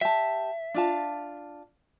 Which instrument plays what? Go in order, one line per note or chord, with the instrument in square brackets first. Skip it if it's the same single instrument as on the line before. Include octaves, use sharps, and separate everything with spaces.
[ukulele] G4 A5 [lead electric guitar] E5
[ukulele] D4 F4 A5